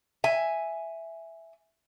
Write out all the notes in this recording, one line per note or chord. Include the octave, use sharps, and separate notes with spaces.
E5 G#5